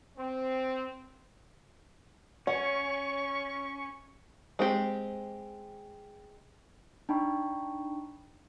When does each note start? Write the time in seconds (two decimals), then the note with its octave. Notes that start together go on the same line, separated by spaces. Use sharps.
0.17 C4
2.47 C#4 C#5 F#5 C#6
4.59 G#3 C4 G4
7.09 D4 D#4 G5 B5 C#6